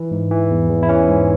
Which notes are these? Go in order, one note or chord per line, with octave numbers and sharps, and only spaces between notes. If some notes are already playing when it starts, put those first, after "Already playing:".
Already playing: E3
G#2
E3
E2
E2
E4
E3 C#4
G#2